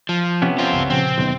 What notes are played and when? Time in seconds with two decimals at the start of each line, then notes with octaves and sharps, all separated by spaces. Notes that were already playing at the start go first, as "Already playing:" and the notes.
0.09 F3
0.42 C3 B3 C#4
0.58 C4 F4
0.72 C#2 G2 C#3
0.90 A#2 C#3 F3 C4
1.18 B1 E2 C3 D#3